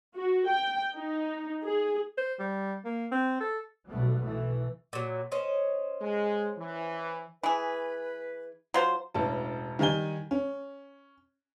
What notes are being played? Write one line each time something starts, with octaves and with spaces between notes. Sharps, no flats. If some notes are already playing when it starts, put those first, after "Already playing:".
F#4
G5
D#4
G#4
C5
G3
A#3
C4
A4
B1 B2 G3 A3 B3
B2 E3 A3
A#2 F#3
C#4 C5 D#5
G#3
E3
E3 G#4 B4
F#3 F4 C5
E1 A1 A5
D#3 G3 D#4 G#5 G7
C#4